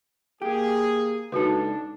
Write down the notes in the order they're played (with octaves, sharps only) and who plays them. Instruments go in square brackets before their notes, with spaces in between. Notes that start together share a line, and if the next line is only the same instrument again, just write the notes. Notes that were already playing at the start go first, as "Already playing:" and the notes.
[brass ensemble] A#3 G#4 [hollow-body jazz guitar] G4
[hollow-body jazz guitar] C#2 A4 [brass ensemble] D4 [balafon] D#4 F#4 B4